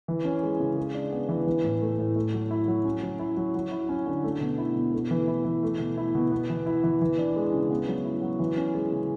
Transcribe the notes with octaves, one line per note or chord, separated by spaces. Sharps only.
E3
C#4
G#3
C#3
G#3
D4
B3
E3
E3
A2
A3
A2
A3
F#3
E4
F#3
C#4
F#3
E4
F#3
F#3
E4
C#4
D3
A3
B2
E4
B2
A3
E3
E4
E3
A3
B2
E4
B2
B3
E3
E4
E3
E3
D4
G#3
C#3
B3
F#3
E4
F#3
E3
C#4
G#3
C#3